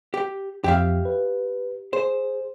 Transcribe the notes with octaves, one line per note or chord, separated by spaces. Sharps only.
G4
F2 F3 G4 E5 F5
B4
G#4 C5